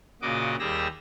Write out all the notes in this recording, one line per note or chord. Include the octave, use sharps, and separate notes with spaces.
A#2 C#3 F#4 D#5 D6
D#2 G3 G4 G#4 E6 A#6